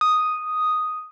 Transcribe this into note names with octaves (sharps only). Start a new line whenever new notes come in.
D#6